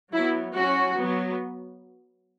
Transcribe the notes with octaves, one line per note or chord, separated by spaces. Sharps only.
F#3 B3 E4
F#3 C#4 F#4
F#3 B3